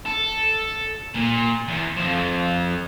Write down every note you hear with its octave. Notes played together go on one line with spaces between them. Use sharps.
A4
A#2
E2
F2 F3